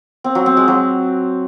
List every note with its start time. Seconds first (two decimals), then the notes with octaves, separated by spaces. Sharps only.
0.24 C4
0.35 F#3
0.46 C4
0.57 G#3
0.68 F#3